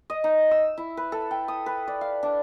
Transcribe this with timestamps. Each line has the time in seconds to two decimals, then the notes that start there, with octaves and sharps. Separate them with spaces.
0.10 D#5
0.24 D#4
0.51 E6
0.77 E4
0.97 B4
1.12 A4
1.31 G5
1.48 D#6
1.66 B4
1.88 D5
2.01 F5
2.23 D4